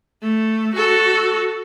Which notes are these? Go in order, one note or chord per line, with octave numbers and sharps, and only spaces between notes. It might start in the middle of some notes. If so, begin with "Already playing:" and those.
A3
F#4 A4